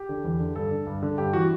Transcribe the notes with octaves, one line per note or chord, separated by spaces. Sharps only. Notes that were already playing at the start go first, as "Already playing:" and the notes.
Already playing: G4
D3
E2
D3
G2 A4
D3
G2
D3
G2 G4
E3 F#4